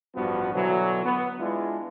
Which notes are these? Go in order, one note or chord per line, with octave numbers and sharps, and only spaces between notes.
A1 G2 F3 B3 F#4
B2 D3 E3 F#3
B3
G#3 B3 D4 E4 F4